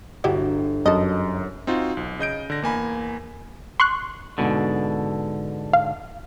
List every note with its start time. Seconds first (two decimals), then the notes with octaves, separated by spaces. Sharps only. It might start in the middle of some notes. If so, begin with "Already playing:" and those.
0.24 G1 F#3 E4 G4
0.86 F#2 A4 D#5
1.67 C4 D#4 F4 F#4
1.97 B1
2.19 C#3 D#5 G6 D7
2.50 D3 A#6
2.62 E2 A#3 G#5 B5
3.80 C6 C#6 F#6
4.38 G#2 B2 D3
5.73 F5